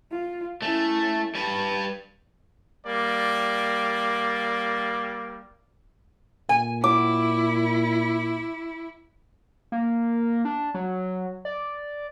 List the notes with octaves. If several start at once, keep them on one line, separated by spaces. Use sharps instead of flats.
F4
A3 C#4 E4
G3 B4 A5
G3 A#3 D5
A#2 G#5
E4 D6
A#3
D4
F#3
D5